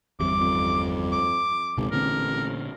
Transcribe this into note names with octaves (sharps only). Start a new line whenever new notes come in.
G1 E2 C3 G3 D6
F2
D6
G#1 C#2 B2
A1 A#2 D3 C4 A#4